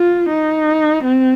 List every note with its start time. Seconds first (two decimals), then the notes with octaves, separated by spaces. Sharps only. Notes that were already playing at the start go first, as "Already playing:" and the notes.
Already playing: F4
0.29 D#4
1.04 C4